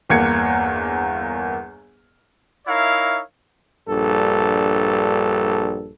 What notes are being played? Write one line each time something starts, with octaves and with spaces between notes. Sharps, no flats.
G1 E2 A#3 G#6 C#7
D#4 E4 A#4 C#5 E5 F5
A#1 G2 A4